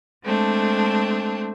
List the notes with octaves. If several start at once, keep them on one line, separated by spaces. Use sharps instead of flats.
G#3 A3 C4 D4